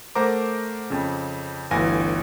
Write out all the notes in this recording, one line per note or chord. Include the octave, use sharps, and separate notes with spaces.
A3 A#4 C5 F#5 A#5 D6
F2 C#3
G1 D2 E3 F5 G#5 A#6